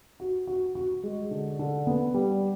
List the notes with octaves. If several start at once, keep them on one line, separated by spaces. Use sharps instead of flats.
F#4
F#4
F#4
G#3
D3
D3
B3
G3